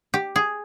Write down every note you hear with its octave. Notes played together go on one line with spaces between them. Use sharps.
G4
G#4